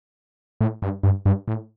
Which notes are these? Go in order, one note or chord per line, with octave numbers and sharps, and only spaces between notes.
A2
G2
G2
G2
A2